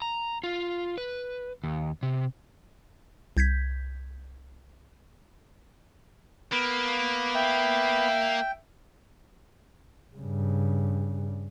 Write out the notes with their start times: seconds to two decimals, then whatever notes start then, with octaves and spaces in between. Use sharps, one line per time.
0.02 A#5
0.44 F4
0.98 B4
1.64 D#2
2.03 C3
3.37 C2 G6 G#6 B6
6.52 A#3 B3
7.35 E5 G5
10.16 G2 C#3